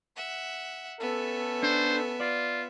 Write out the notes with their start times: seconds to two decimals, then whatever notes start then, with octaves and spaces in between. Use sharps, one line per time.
0.16 E5 F#5
1.00 B3 C#4 A4 E5
1.63 D4 C5
2.20 F4 D5